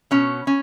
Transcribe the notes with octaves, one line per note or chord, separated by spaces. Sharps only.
B2 C#4
C#4